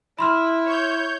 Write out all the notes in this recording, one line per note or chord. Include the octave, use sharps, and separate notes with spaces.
E4 B5 C6 F6
C#5 G6